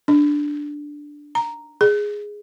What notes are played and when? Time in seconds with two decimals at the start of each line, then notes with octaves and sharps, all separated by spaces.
0.08 D4
1.35 A#5
1.81 G#4